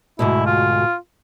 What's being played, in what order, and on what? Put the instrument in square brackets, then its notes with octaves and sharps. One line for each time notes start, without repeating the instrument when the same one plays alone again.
[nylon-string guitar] D2 G#2 B2 [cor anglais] E4
[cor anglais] F4